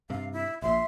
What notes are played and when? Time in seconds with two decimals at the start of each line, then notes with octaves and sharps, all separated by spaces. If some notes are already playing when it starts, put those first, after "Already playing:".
0.10 G2 C3 F5
0.33 E4
0.62 A#1 A#2 E5 C6